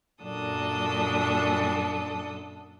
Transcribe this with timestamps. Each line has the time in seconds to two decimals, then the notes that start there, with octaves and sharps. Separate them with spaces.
0.23 F#2 A#2 D4 A4 D#6